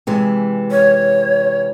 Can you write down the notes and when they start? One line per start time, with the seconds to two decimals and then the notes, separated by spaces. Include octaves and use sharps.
0.07 C3 E3 G#3
0.71 C#5